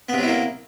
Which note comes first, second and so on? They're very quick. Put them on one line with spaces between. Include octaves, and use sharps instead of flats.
B3 C3 F#3 E4 A#3